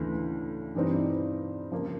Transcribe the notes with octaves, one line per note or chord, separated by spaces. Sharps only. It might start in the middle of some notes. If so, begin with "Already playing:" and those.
Already playing: D2 C#3 E3 A3
G2 E3 G3 C4 D#4
C#3 F3 A#3